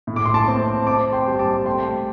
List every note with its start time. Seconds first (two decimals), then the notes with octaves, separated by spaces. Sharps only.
0.07 A2
0.16 D6
0.26 C6
0.34 A5 D6
0.47 C4
0.86 C4 A5 D6
1.13 G5 C6
1.27 G3
1.39 A5 D6
1.66 A3 G5 C6